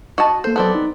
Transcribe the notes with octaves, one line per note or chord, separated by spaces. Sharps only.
F#4 D#5 A5
A#3 A4 C5
F#3 B3 C4 A4 D5 A5
D#4